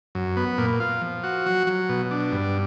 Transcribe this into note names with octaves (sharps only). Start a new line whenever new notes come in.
F#2
B3
A#2
F4
F3
F#4
F#3
F#3
B2
D4
G2